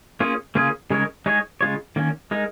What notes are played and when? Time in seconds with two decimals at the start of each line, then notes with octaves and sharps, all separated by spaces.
0.20 A#3 C#4 F4 G#4
0.55 C#3 A#3 C#4 F4 G#4
0.90 C#3 G#3 D#4 A#4 C#5
1.26 G#3 D#4 G#4 C#5
1.61 C#3 G#3 F4 C#5
1.96 D#3 A#3 C#4
2.31 G#3 D#4 A#4